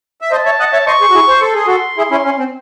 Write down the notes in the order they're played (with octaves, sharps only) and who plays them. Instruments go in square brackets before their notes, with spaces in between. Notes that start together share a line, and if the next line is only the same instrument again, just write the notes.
[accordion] E5
[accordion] C5 D#5 [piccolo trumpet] A5
[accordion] C#5 E5
D#5 F#5
C#5 E5
[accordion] C5 D#5 [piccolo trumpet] C#6
[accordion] G#4 C5
F#4
E4 G#4
C5
[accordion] A4 [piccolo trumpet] C6
[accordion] G#4
F#4 A4
E4 G#4
C#4 E4
C#4
C4